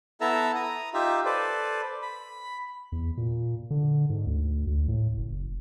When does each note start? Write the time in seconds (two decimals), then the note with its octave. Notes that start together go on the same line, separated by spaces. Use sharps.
0.21 B3 E4 A4 E5 A5 A#5
0.55 A#5 D#6
0.94 D#4 F4 G4 E5
1.25 A4 B4 C5 D5
2.02 B5
2.92 E2
3.17 A#2
3.70 D3
4.10 G#2
4.27 D2
4.67 D2
4.88 A2
5.18 F#1